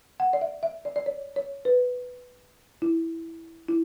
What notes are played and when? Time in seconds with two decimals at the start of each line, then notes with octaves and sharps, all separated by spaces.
0.20 F#5
0.33 D5
0.42 E5
0.63 E5
0.85 D5
0.96 D5
1.06 C#5
1.36 C#5
1.65 B4
2.82 E4
3.68 E4